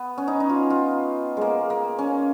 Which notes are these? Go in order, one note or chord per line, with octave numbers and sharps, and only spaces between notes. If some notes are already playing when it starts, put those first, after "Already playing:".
Already playing: B3
C#4
D#4
D#4
F4
F4
G#3 A#3
A#3
C#4